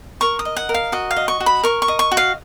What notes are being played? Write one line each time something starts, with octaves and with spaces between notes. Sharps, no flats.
A#4 C#6
D#6
D#5
F#5
A#4
F5
F#4 D#5
F5
D#5
C#6
F#4
B5
A#4 C#6
C#6
D#5
C#6
F#4
F5